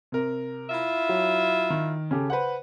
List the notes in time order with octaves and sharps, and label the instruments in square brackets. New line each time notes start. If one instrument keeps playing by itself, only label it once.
[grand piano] C3 A#4
[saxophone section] E4 F4 E5
[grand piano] F#3
D#3
C#3 G4 A4
B4 C5 F#5